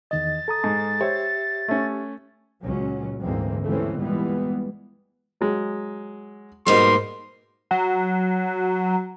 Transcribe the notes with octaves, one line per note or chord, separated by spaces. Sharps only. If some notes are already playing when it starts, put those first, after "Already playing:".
E2 D#3 D#5 A6
A4 A#5 D#6
G#2
G4 C5 C#5 E5
A3 C#4
C#2 A#2 F#3 C#4
D2 G#2 E3 G#3 A#3 C4
G1 D#2 E3 A3 C4 C#4
A#2 E3 G3 G#3 B3
F#3 G#3
G#2 B2 G3 A#3 D#4 C6
F#3